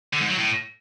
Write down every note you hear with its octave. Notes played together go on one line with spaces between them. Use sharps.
D3
G#2
F#3
A2